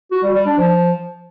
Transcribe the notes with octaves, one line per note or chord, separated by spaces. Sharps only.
F#4
G3
G3
D4
F3